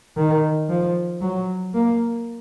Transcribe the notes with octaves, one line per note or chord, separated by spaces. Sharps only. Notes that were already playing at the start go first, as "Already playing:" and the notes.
D#3
F3
F#3
A#3